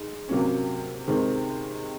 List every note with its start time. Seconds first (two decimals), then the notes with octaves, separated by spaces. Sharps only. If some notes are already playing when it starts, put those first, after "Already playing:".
Already playing: G#3 D#4
0.28 C3 F#3 A#3 C#4
1.07 C3 D#3 G#3 C4